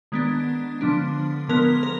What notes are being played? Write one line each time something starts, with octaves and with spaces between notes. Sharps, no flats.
D#3 G#3 B3 D4
D3 F3 B3 D4
D3 F3 G#3 B3 A#4
A#4